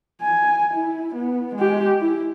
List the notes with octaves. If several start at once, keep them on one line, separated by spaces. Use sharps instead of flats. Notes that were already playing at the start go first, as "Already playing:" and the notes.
G#5
E4
B3
G#3 G4
E4